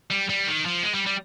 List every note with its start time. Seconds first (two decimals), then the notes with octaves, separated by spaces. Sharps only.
0.11 G3
0.29 G3
0.47 D#3
0.65 F3
0.83 G#3
0.94 G3
1.07 G3